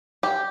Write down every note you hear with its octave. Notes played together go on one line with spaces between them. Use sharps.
G4